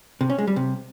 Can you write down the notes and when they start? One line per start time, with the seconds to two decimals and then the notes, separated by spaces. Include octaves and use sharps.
0.21 C3
0.30 C#4
0.39 G#3
0.47 G3
0.56 C3